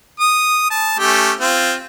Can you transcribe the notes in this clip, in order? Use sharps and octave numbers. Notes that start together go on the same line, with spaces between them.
D#6
A5
A3 C#4 G4
C4 F4